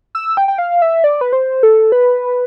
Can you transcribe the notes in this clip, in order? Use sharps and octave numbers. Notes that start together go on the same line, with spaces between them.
E6
G5
G5
F5
E5
D5
B4
C5
A4
B4